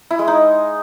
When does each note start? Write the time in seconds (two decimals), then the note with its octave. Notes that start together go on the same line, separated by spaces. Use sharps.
0.11 E4
0.19 G#3
0.28 D#4